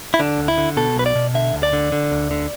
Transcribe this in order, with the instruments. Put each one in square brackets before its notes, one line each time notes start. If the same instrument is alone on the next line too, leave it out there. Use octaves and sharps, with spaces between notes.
[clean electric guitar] E4
D3 D4
D2
E4
D3
B2 A4
B1 B4
D5
B2
D3 E5
D2
D5
D3
D3
D2
D3